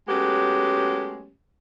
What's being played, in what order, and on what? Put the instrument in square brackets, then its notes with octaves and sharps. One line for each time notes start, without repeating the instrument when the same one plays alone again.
[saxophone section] F#3 G#3 A3 B3 C#4 G4